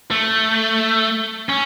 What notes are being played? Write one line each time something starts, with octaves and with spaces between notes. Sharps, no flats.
A3
C#4